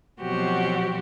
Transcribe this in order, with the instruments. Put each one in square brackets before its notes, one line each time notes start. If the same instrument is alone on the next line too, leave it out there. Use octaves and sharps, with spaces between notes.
[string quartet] B2 F3 F#3 C4 F#4 G4